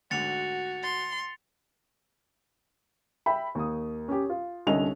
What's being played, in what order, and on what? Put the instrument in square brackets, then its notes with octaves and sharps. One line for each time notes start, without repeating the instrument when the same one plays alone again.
[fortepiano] D2 G#2 D3 [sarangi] F#4 [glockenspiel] A6 C#7 F7
[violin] C6 [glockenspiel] A6
[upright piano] E5 G5 B5
D#2 D#6
C#4 G4
F4
C2 D3 C#4 D#5 F7